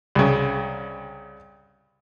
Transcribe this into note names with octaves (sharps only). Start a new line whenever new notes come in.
C2 C#3